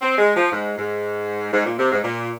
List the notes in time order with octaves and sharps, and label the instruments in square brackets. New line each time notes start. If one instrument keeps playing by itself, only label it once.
[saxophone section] C4
G#3
F3
G#2
G#2
G#2
A#2
C3
G#2
A#2